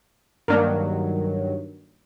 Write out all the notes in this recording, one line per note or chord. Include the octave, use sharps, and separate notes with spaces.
G2 D#3 F#3 A#3 D4 A#4